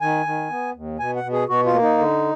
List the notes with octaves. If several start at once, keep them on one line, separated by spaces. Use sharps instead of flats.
D#3 G#5
D#3
B3
D#2
B2 G#5
F#5
B2
G#4
B2 F#4
F4
A#3
D#4
D3